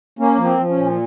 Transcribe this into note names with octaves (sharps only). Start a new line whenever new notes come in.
A#3 C#4
F3
C4
F3
C#4
A#2